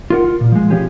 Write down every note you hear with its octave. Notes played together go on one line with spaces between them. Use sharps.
F4 A#4 F#5
F4
A#2
F3 G#3
B1 F3 B3 C#4 G4 G#4